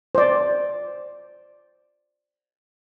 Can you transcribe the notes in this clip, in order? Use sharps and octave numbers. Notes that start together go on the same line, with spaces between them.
C5 D5